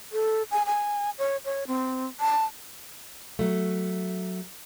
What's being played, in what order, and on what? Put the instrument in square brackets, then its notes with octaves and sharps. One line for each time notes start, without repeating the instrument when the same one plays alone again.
[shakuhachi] A4
G#5
G#5
C#5
C#5
C4
A5
[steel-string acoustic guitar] F#3 A3